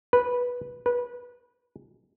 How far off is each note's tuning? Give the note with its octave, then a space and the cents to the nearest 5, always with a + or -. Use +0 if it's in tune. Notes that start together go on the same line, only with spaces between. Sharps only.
B4 -10
B4 -20